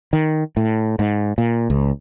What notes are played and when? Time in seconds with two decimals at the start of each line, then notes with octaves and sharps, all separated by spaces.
0.13 D#3
0.57 A2
0.99 G#2
1.38 A#2
1.70 C#2